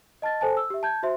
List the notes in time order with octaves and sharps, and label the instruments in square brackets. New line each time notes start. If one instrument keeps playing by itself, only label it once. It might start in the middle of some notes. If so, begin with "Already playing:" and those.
[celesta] D#5 A5 F6 A6
A4 C5 G#5 A5
E6
G4 E5
A5 G6 G#6
F#4 C5 E5 C6